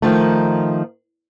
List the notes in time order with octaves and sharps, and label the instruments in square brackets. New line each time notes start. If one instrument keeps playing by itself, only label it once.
[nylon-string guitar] D#3 F3 A3